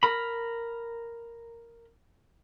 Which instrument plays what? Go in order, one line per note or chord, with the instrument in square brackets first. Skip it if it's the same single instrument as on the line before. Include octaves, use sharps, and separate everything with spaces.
[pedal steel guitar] A#4 B5